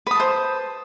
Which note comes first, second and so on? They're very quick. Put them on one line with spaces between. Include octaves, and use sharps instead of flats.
B4 D#6 A5 C5